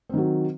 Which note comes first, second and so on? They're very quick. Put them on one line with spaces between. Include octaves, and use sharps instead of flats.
C4 D#3 F#3